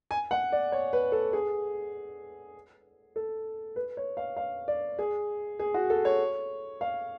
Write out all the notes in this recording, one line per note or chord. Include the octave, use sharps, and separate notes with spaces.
G#5
F#5
D5
C#5
B4
A4
G#4
A4
B4
C#5
F5
F5
D5
G#4
G#4
F#4
A4
C#5
F5